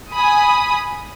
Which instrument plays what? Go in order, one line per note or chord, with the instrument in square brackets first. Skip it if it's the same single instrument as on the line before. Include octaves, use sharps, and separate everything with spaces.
[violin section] G#5 B5 D#6